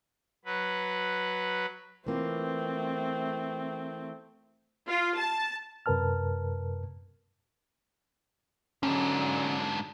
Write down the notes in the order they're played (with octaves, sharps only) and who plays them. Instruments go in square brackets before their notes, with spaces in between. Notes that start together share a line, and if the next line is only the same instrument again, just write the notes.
[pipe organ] F#3 B4
[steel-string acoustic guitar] E3 A#3 F4 [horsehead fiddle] A3 C4
[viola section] F4
A5
[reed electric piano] F#2 C3 A#4 B4 A5 F6
[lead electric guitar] G#2 D4 [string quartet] D3 F#3 G#3 [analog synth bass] C#4